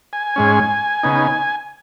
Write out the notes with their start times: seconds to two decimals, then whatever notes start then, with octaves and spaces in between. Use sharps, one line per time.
0.13 G#5
0.36 G#2 G#3 C#4
1.03 C#3 B3 D#4